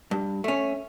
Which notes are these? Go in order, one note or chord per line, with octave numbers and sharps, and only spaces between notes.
G2
A3 C#4